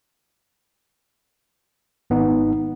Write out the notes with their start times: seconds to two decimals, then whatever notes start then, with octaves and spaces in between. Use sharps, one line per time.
2.10 G#1 B3 D#4